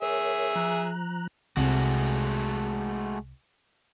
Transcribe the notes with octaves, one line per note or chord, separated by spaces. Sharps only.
G#4 A#4 C#5 E5
F3 A#5 F#6
C2 C3 G#3 A3 F#4